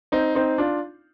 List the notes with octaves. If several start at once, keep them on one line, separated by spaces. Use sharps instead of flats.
C4 D#4
C4 D#4
D4 F4